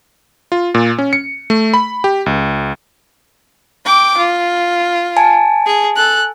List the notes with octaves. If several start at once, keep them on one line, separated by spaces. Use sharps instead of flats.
F4
A#2
C#4
C#7
A3
B5
G4
C#2
G5 D6
F4
G#5 A5
G#4
A4 F#6